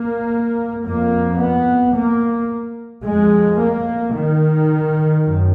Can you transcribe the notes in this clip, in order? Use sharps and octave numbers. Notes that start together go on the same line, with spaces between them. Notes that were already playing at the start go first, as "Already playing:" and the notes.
Already playing: A#3
F2 A#3
B3
A#3
F2 G#3
A#3
D#3
F#2